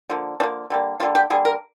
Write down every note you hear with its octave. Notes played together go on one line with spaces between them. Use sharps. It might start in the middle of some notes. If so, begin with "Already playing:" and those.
D3 F3 A#3
D3 F3 A#3 D4
D3 G3 A#3
D3 G3 A#3 F4
G4
D3 G3 A#3 G#4
A#4